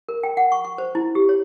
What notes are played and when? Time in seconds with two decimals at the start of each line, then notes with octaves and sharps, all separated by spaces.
0.09 A#4
0.23 G5
0.37 F#5
0.52 C#6
0.65 C#6
0.78 C5
0.95 E4
1.15 G4
1.29 C#5